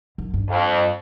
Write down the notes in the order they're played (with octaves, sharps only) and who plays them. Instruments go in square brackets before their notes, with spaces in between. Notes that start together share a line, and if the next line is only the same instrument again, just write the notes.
[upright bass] F#2
G2
[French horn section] F2